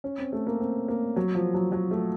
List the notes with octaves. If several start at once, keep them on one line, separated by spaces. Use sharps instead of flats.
C#4
C4
A3
A#3
C4
A#3
F#3
F3
F#3
F#3
A3